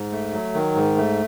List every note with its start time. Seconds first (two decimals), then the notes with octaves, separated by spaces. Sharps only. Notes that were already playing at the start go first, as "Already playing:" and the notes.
Already playing: G#2
0.12 A3
0.33 F#3
0.54 D#3
0.75 G#2
0.96 A3